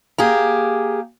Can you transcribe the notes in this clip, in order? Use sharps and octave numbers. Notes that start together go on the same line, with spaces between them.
A#3 G4 G#4